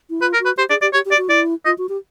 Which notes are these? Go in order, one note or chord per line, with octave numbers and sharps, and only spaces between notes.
E4
F4 B4
A#4
F#4
B4
G4 C5
G#4 D5
G4 D5
G4 C#5
G4
D5
F#4
E4 D5
F4 D#5
F#4
G4